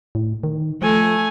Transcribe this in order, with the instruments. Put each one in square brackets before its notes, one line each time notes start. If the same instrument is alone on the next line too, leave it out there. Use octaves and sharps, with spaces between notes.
[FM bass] A2
D#3
[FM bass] F3 [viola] A3 G#5